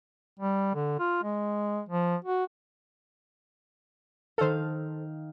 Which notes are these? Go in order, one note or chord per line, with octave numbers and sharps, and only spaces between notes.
G3
D3
F4
G#3
F3
F#4
D#3 A4 C5 F5